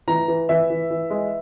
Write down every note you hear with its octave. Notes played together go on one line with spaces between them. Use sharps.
E3 A#5
E3
E3 E5
E3
E3
G#3